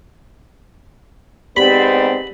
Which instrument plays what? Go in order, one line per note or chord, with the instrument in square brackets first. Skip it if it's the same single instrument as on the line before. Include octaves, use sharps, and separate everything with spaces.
[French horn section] G#2 B3 C4 [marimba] G4 [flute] D5 [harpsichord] B5